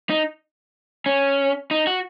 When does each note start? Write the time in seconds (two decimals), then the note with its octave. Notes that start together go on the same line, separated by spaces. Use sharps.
0.10 D#4
1.06 C#4
1.71 D#4
1.87 F#4